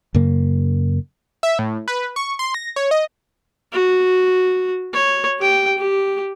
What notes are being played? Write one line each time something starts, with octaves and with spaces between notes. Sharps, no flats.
F#2 C#3 A#3
E5
A2
B4
C#6
C6
A#6
C#5
D#5
F#4
C#5
G4 G5
G4